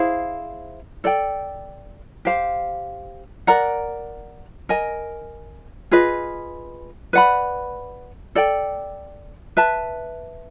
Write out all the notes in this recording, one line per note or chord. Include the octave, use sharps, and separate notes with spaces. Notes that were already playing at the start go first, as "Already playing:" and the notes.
Already playing: E4 G#4 C5 F5
A4 D5 G5
G4 C5 F5
A#4 D5 F#5 A#5
A#4 D#5 G#5
F4 G#4 B4 D#5
B4 D5 F#5 B5
A4 D5 G5
B4 E5 A5